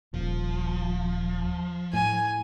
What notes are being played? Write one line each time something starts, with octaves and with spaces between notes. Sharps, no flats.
D#1 F3
A2 G#5